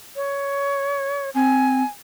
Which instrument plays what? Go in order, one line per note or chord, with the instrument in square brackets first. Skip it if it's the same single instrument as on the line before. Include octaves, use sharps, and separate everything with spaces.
[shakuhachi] C#5
[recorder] C4 [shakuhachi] G#5